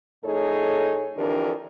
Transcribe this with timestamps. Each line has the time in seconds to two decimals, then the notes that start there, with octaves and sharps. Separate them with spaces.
0.23 F2 A2 D#4 G#4 A4 C#5
1.17 F2 D3 E3 D4 G4 A#4